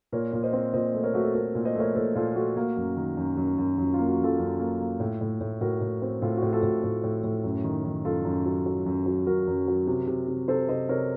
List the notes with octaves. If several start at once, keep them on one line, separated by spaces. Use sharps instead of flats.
A#2 A#4 C#5
A#2
C5 D#5
C4
A#2 C5 D#5
A3
A#4 C#5
A3 F#4
A4
A3 F#4 A#4
A#2
C5 D#5
A3 A#4 C#5
A#2 A4 C5
A#2 F4 A4
A3 F#4
A#3
F#2
D#3
F#2
F#2
F#2
F#2 F4
A#3 F4
F#4
F#2
F4 A4
F#2
A#3
A#3
A2
A2
A2
A2 F#4 A#4
A2
C4
A2 F4 A4
F#4
A2
F4 A4
A2
F#4
A2
A2
A2
F#2
D#3
D#3
F#2 F4 A4
F#2
F#3
F#3
F#2
F#3
F#2 F#4 A#4
F#2
F#3
C3
C3
C3
C3 A4 C5
C3 C5 D#5
C3 A#4 C#5